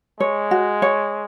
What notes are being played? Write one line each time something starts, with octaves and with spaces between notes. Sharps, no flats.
G#3 C#5
F#4
C#5